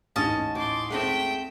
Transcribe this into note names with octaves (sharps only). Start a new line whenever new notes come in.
A1 D#2 C#4 D#5 A5
A2 C6 D6
G#3 A3 C4 E5 G5